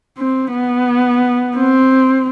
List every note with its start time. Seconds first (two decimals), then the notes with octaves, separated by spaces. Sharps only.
0.18 C4
0.52 B3
1.56 C4